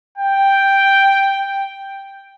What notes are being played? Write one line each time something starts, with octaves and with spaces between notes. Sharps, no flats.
G5